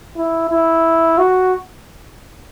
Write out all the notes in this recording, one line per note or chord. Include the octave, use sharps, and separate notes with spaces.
E4
E4
F#4